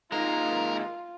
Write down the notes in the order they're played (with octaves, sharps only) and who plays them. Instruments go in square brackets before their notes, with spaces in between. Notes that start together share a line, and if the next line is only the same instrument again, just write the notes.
[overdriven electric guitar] G#3 A#3 [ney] D#4 [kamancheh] F4 [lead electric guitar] A#4